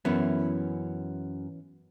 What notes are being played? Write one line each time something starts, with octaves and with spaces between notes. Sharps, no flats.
F#2 E3 B3 C#4 E4